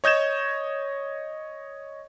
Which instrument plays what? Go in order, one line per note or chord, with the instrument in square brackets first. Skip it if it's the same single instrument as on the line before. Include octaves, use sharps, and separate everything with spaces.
[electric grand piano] C#5 D#5 G6 G#6 E7